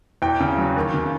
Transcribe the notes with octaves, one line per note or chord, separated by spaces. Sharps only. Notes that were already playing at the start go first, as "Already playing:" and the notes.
E2 G5
C#3
F#3
D#2
C#3